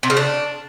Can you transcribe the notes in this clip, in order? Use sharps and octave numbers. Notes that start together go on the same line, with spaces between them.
C3
C#3
D4